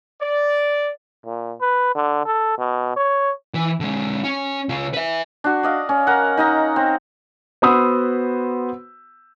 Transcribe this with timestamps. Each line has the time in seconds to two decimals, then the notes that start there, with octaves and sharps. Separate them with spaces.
0.21 D5
1.26 A#2
1.61 B4
1.95 D3
2.26 A4
2.58 B2
2.96 C#5
3.54 E3
3.80 D3 G#3
4.24 C#4
4.69 C#3 F4
4.93 B4 E5
5.44 D4 F#4
5.63 D5 D#5 F5
5.89 C#4
6.07 A#4 F#5
6.37 D#4 D#5 A#5
6.76 C4
7.62 B3 F#4 C5 B5 D#6 E6